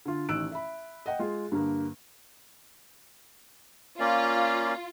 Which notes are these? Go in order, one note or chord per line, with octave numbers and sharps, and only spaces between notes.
D3 F4
A1 D#3 E6 F#6 D7
E5 B5
D#5 F#5 G5
G#3 F4
G2 D3 A#3
A#3 C#4 F4 D5